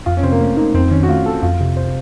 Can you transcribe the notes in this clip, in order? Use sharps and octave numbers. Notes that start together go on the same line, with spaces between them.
F2 F4
C#4
C3 C4
A#3
A3 C#4
A#3 D#4
F2 C4
D#3 C#4
F#4
A3 F4
A3 A4
F2 F4
C3
C5